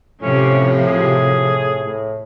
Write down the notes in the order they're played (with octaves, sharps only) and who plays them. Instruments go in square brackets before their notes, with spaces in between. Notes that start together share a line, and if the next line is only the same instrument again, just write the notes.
[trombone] A2 [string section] C3 F3 [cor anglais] C#4
[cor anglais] G#4
[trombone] A2